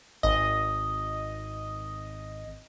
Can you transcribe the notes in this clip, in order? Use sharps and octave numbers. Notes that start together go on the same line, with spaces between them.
G#1 D#5